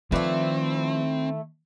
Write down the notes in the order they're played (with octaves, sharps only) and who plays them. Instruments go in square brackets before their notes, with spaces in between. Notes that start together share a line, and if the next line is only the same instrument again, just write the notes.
[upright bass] D#3 [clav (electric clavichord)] F3 B4 D5 [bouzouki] A3 E4 [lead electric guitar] C4